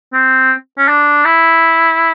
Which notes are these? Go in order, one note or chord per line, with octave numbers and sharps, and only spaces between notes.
C4
C#4
D4
E4